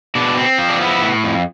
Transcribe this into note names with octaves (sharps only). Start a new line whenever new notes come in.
B2 D4
C4
F3
D4
B3 E4
A2
F2